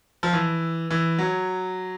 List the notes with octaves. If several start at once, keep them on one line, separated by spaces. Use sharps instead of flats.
F3
E3
E3
F#3